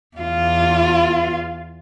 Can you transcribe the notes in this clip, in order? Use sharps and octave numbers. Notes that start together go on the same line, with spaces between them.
E2 F4